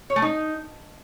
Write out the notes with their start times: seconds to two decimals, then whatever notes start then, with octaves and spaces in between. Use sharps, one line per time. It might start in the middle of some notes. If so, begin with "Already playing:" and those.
0.10 C#5
0.16 A3
0.22 D#4